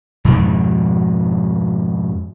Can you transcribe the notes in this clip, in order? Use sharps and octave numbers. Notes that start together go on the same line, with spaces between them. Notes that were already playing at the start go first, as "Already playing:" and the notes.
F2 G#2 B2 D#3